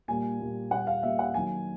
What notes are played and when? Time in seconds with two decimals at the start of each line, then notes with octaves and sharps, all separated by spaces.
0.08 A#2 G3 A#3 G#5
0.40 A#2 G3 A#3
0.71 A#2 G3 A#3 F#5
0.87 F5
1.03 A#2 G3 A#3 E5
1.19 F#5
1.34 D#3 F#3 A#3 G#5